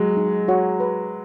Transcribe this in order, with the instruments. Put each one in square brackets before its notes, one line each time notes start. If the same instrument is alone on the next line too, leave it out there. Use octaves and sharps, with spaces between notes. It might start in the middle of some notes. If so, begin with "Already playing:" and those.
Already playing: [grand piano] F#3 G#3
[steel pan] D#4
F#4 C#5 F#5
B4